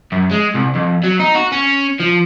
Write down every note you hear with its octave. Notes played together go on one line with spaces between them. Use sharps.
F#2
G#3
C2
F2
F#3
D#4
F#4
C#4
F3